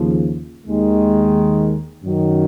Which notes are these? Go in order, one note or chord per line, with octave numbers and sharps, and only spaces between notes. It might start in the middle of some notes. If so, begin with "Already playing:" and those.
Already playing: D#2 C#3 F3
D#2 D#3 G#3
F#2 D#3 F#3